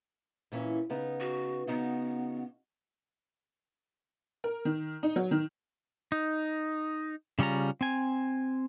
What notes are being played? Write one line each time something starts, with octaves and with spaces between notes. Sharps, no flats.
A#2 E3 C#4
C#3 B3 D#4
F#4
C#3 B3 D#4 F#4
A#4
D#3
D#4
F#3
D#3
D#4
C#3 G3 C#4 F4 A#5
C4 G#5